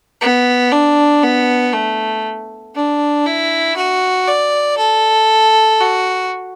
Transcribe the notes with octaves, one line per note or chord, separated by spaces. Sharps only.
B3
D4
B3
A3
D4
E4
F#4
D5
A4
F#4